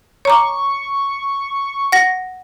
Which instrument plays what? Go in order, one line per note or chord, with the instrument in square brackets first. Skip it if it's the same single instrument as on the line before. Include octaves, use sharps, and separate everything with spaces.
[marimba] C#5 A#5 D6 [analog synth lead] C#6
[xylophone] F#5 A#6